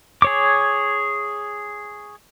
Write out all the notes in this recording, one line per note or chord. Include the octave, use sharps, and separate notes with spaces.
G#4 C#5 D6